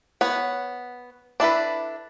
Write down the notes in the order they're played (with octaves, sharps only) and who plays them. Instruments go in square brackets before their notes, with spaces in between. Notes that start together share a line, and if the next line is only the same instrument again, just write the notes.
[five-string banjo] B3 C#5 F#5
D4 E4 A4 B4